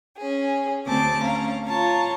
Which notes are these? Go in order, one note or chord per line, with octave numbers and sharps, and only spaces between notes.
C#4 G#4
D2 C4 A5 D6
C#4 F5 A#5
F4 C#5 A5 A#5